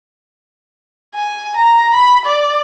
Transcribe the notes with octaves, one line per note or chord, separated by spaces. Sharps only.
G#5
A#5
B5
D5